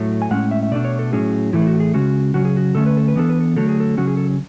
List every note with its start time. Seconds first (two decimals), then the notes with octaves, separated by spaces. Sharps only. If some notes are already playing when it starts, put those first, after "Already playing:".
Already playing: A2 F#3 A3
0.22 G#5
0.31 A2 G#3 C#4 F#5
0.51 E5
0.63 E5
0.72 B2 A3 D4 D5
0.85 C#5
0.99 A4
1.13 A2 F#3 C#4 G#4
1.53 A2 E3 A3 E4
1.62 G#4
1.67 F#4
1.80 G#4
1.94 C#3 G#3 C#4 F#4
2.34 C#3 F#3 C#4 F#4
2.45 G#4
2.57 F#4
2.75 D3 A3 C#4 A4
2.86 B4
2.97 A4
3.08 B4
3.16 E3 B3 D4 A4
3.29 B4
3.41 A4
3.56 D3 F#3 A3 A4
3.69 G#4
3.80 A4
3.97 C#3 F#3 C#4 F#4
4.08 G#4
4.17 A4